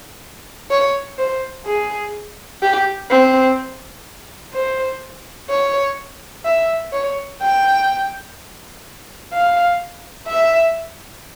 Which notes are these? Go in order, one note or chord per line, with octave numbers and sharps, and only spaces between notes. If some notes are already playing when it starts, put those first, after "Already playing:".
C#5
C5
G#4
G4
C4
C5
C#5
E5
C#5
G5
F5
E5